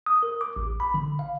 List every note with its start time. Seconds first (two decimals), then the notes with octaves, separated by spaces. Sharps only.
0.06 D#6
0.23 A#4
0.41 D6
0.56 A1
0.80 B5
0.94 D3
1.19 F5